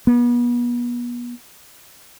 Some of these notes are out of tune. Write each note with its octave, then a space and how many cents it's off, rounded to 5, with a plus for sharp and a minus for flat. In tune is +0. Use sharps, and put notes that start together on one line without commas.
B3 -35